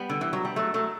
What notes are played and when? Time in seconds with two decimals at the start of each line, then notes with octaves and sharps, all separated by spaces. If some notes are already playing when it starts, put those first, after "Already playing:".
Already playing: G3 B3
0.10 D3
0.21 E3
0.33 F#3
0.45 G3
0.56 F#3 A3
0.74 F#3 A3